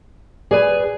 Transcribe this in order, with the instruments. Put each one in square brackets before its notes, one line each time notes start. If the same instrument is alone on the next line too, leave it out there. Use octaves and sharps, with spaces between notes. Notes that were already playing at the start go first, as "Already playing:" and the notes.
[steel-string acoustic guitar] G#4 B4 G#5 [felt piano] D5